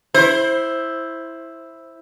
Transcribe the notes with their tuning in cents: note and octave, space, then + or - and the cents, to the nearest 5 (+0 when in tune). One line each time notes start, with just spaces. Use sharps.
E4 +0 C5 +15